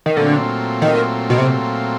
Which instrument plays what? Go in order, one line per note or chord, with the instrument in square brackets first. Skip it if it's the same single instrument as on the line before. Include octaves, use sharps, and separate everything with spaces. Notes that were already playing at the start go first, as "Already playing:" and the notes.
[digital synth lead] D#3
[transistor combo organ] A#2 F#3 A3 C4 F4 [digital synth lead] D3
[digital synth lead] D#3
B2
C3